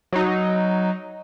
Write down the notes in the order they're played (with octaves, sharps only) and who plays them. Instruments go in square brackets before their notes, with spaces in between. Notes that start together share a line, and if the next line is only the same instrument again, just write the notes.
[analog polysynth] F#3 D#4